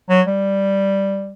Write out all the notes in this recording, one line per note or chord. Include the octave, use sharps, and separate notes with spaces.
F#3
G3